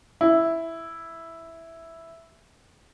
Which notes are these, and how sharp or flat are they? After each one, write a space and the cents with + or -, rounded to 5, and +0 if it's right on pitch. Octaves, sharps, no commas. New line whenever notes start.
E4 +0